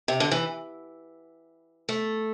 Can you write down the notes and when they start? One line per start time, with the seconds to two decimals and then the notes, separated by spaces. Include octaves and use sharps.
0.08 C3
0.20 D3
0.31 E3
1.89 A3